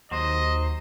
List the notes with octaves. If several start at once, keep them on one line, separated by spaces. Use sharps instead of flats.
D#2 F#3 C5 D#5